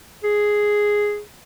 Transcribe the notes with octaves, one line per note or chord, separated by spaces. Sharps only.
G#4